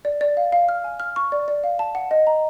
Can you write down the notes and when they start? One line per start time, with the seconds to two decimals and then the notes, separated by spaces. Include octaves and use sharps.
0.05 D5
0.21 D5
0.37 F5
0.52 F5
0.69 F6
0.84 G#5
1.00 F6
1.16 C#6
1.32 D5
1.48 D5
1.64 F5
1.79 A5
1.95 F#5
2.11 D#5
2.27 A#5